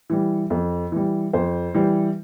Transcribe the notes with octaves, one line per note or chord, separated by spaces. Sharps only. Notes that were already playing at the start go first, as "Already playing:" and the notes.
E3 G3
F2
E3 G3
F2 C5
E3 G3